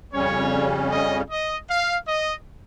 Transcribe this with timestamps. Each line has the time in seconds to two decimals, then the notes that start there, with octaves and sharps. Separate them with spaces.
0.13 F2 C#3 G3 C#4 C#5
0.91 D#5
1.30 D#5
1.69 F5
2.07 D#5